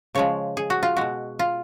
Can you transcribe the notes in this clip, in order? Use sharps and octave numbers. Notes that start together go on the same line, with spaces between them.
C#3 F3 G#3 C#5
G#4
F#4
F4
B2 G#3 F#4
F4